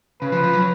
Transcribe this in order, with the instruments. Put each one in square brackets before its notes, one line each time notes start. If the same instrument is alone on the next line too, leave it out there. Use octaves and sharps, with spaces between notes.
[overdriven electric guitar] C#3 [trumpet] B4
[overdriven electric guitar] F3
F3
F#3